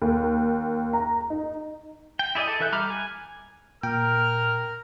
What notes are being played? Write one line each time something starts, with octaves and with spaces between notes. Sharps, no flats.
D#2
A#5
D#4
G5
E4 G#4 D5 D#5
A4
E3 A4 E5 F#6 G6
G3 A#5 B5 D6 F6
G#5
A#2 A#4 G5 F6